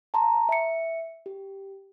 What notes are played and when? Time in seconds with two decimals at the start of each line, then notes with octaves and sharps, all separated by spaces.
0.14 A5 A#5 C6
0.49 E5 C#7
1.26 G4